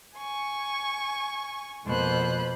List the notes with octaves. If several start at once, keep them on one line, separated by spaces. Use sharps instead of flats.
G#5 C#6
F2 B2 A#3 C5 B5 F#6